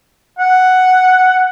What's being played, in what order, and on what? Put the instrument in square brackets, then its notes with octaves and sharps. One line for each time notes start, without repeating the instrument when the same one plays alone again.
[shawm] F#5